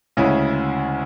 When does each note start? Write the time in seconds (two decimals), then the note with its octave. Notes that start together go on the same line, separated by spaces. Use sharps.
0.17 D2 C#3 G#3 C#4 E4